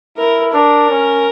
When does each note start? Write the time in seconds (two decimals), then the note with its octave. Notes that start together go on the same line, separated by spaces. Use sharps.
0.17 E4 A#4
0.53 D4 A#4
0.90 C#4